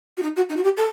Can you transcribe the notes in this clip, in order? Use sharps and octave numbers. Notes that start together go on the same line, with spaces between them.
F#4
D#4
F#4
D#4
F#4
G4
A4